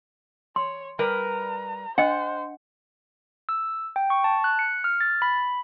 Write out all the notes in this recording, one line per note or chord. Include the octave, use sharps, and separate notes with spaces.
C#5 C6
G3 A#4 B4 A#5
D4 C5 D#5 F#5
E6
G5
C#6
A5
F#6
C#7
F6
A6
B5